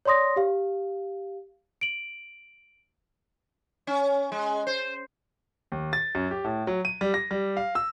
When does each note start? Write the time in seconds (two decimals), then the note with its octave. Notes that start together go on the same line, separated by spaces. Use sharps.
0.05 C#5 D5 C6 D#6 A#6
0.36 G4 F5
1.81 D7 F#7
3.87 C#4
4.32 G#3
4.67 C5
5.72 D#2
5.93 A6
6.15 F#2
6.31 G4
6.44 A2
6.67 F#3
6.85 D#7
7.01 G3
7.14 A#6
7.31 G3
7.57 F5
7.75 E6